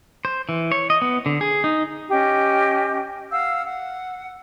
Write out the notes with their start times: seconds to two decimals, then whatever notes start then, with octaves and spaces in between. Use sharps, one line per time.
0.25 C5
0.49 E3
0.72 C#5
0.90 D#5
1.02 B3
1.26 D3
1.41 G#4
1.64 D#4
2.10 C#4 G4 D#5
3.31 F5 F#5 E6
3.65 F#5